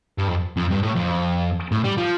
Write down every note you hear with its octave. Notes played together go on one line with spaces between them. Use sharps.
G2
F2
F2
G2
A2
F2
A2
G3
F3